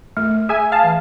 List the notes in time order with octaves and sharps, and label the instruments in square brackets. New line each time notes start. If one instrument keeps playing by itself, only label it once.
[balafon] A3
[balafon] G#4 [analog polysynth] E5 G#5
[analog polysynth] F5 A5
[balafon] E3